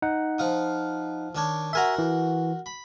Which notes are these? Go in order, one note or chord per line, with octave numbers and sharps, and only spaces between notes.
D#4 F#5
F3 F5 D#6
D#3 D4 C#5
F#4 A#4 E5 G#5 A#5 C6
E3
B5